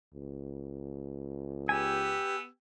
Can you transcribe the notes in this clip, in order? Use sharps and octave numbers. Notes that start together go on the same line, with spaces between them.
C#2
B3 G4 G#5 E6